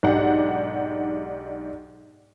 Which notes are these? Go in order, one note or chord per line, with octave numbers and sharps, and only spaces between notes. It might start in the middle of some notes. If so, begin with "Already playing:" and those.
B1 G#2 D4 G4 F#5